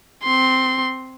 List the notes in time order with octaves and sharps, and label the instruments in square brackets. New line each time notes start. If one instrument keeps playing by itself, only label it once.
[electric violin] C4 C6